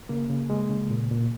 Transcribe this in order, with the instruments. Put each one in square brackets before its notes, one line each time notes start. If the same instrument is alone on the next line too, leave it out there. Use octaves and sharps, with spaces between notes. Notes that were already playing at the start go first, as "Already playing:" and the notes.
[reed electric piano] C#3 A#3
C#3
G#3
C#3
A#2
A#2